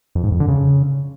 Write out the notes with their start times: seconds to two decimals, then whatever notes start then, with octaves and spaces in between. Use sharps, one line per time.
0.15 F2
0.24 G#2
0.32 F2
0.40 D3
0.48 C#3